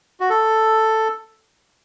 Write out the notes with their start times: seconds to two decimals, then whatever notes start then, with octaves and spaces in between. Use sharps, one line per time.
0.20 F#4
0.30 A4